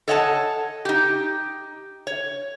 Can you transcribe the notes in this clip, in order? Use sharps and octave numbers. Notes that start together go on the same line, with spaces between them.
A4 C#5 D#5 F#5 G#5 A5
D#4 G4
C#5